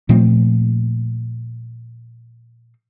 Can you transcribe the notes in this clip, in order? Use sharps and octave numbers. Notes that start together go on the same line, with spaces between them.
A#2 F3 A3 C4